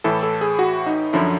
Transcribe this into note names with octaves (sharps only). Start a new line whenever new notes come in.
A2 E3 A4
A4
G#4
F#4
D#4
F#2 D3 F3 E4